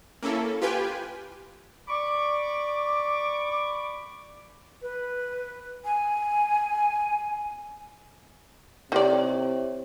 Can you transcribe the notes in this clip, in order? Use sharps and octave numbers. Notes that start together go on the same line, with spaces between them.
A#3 C#4 E4 A4
F4 G4 B4 G5 G#5
D5 B5 C#6 D6
B4
G#5
C3 D#3 E4 G4 C#5 D5